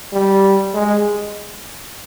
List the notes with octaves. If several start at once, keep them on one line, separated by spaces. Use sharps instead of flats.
G3
G#3